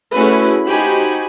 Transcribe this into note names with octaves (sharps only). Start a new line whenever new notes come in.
A3 C#4 E4 F#4 G#4 B4
D#4 F#4 G4 C5 G#5 B5